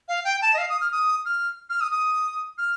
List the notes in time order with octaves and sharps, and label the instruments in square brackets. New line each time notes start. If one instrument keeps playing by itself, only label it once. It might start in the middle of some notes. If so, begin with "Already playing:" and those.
[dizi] F5
G5
A5
D#5
F5
D#6
F6
D#6
F6
F6
D#6
D#6
F6